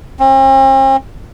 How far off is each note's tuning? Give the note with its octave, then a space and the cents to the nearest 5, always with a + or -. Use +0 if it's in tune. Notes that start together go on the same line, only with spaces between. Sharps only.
C4 +45